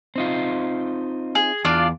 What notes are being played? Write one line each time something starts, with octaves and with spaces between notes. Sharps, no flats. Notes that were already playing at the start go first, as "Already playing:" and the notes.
C4 D#4 F4
G#4
E2 D4 F4 D5